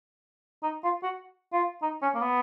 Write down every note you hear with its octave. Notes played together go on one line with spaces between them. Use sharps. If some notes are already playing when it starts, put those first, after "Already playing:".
D#4
F4
F#4
F4
D#4
C#4
A#3
B3